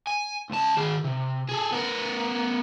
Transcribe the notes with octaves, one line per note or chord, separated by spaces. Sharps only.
G#5
C#2 A5
D#3 G#4
C3
G#4 A4
B3 A#4